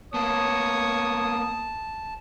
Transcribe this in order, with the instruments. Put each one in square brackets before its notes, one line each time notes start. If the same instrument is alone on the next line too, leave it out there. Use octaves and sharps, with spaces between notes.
[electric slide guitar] A#3 B3 [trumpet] C#5 [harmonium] A5 [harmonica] D#6